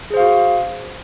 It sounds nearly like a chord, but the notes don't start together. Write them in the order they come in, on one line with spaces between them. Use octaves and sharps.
G#4 C5 F5 F#4